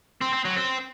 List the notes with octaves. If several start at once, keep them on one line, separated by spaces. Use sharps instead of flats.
C4
C4
F#3
C4